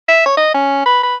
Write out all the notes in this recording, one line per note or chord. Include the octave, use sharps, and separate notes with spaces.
E5
C#5
D#5
C#4
B4
B4